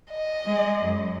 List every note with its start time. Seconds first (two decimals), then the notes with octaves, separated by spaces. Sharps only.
0.11 D#5
0.45 G#3
0.83 F#2